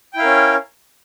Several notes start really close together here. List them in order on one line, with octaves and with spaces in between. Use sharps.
G5 E4 F5 A#4 C#4